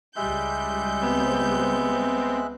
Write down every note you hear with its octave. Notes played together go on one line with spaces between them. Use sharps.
C#2 G3 G#3 E5 F#6 G6
B3 C4